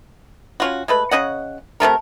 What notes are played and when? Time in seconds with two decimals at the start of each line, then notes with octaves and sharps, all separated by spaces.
0.60 C#4 F4 F#4
0.88 G#3 A3 B4
1.11 C#3 C#4 D#5 F#5
1.80 C3 G3 A3 A#4